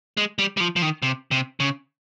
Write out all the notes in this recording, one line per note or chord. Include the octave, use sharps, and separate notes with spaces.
G#3
G3
G3
F3
F3
D#3
C3
C3
C#3